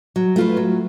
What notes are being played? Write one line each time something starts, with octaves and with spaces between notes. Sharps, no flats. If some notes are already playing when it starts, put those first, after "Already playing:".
F#3
A3 F4 B4
F#3